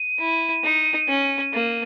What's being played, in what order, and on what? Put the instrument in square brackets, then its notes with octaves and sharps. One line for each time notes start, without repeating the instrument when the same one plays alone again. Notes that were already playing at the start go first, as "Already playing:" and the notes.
Already playing: [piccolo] D#7
[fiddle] E4
D#4
C#4
A#3